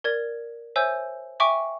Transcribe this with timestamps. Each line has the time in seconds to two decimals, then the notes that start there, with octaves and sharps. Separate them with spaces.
0.04 A#4 D5 G#6
0.76 C5 C#5 E5 G#5 E6 G6
1.40 E5 G5 G#5 C#6 D6